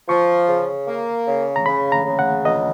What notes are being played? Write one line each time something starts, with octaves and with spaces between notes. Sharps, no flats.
F3 C#6
C#3
A#3
C#3
A#5
C#3 B5
A#5
C#3
F#5
C#2 D#5